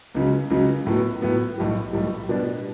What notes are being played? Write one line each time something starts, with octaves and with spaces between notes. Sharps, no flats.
C#2 C#3 F#3
C#2 C#3 F#3
A2 F#3 B3
A2 F#3 B3
B1 A2 G3
B1 A2 G3
B2 G3 D4